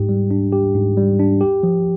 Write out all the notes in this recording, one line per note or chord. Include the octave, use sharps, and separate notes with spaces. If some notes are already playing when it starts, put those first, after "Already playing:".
Already playing: G#2 G4
G3
D4
G4
G#2
G3
D4
G4
F3